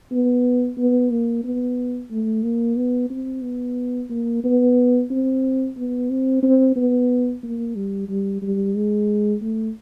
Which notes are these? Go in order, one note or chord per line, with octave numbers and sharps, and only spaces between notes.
B3
B3
A#3
B3
A3
A#3
B3
C4
B3
A#3
B3
C4
B3
C4
C4
B3
A#3
G3
G3
G3
G#3
A3